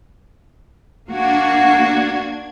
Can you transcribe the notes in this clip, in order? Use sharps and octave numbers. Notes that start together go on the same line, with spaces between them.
A#3 D4 F#4 G#6